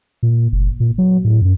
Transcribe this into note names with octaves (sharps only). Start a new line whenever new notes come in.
A#2
F#1
A#2
F#3
A2
F#2